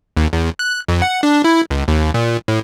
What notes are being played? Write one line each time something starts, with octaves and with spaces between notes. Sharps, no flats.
D#2
E2
F#6
F2
F#5
D4
E4
C#2
D#2
A#2
A2